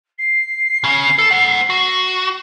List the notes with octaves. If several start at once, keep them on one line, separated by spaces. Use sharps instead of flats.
C7
C#3 C#4
A4
C5 F#5
F#4